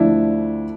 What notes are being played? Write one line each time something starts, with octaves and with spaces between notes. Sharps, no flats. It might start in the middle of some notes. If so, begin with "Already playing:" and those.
Already playing: D2 D3 F3 D4 E4